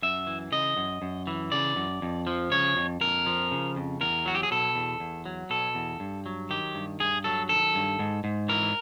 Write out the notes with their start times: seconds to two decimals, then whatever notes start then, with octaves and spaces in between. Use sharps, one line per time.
0.02 F#2 E5
0.27 E3
0.52 C#3 D#5
0.77 F#2
1.02 F#2
1.27 E3
1.52 C#3 D5
1.76 F#2
2.02 F2
2.27 F3
2.52 C#3 C#5
2.77 F2
3.01 F2 A#4
3.26 F3
3.52 C#3
3.76 F2
4.01 E2 A#4
4.25 F#3 F#4
4.35 G4
4.43 G#4
4.51 B2 A4
4.75 E2
5.00 E2
5.26 F#3
5.50 B2 A4
5.75 E2
6.00 G2
6.26 F#3
6.50 D#3 G4
6.75 G2
7.00 G2 G#4
7.24 F#3 A4
7.49 D#3 A4
7.75 G2
7.99 G#2
8.24 G#2
8.49 E3 A#4